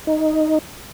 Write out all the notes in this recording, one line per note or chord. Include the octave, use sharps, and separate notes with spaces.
D#4